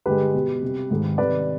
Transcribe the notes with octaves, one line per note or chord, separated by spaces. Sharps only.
G2 D3 G#3 G4 B4
B2 G3
C3 G3
G#2 D#3 G#3
C3 D#3 G3 B4 D5